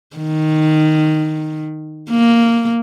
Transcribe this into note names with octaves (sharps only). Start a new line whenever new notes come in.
D#3
A#3